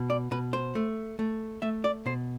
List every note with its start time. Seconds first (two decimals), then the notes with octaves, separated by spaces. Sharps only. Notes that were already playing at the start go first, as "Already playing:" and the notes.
Already playing: B2
0.10 D5
0.31 B2 B4
0.53 C5
0.75 A3
1.19 A3
1.62 A3 E5
1.84 D5
2.06 B2 C5